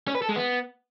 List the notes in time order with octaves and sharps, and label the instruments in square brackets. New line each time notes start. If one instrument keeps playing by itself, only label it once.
[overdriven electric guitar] C#4
B4
A4
G#3
B3